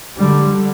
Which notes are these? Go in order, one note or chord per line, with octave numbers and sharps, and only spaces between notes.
D3 G3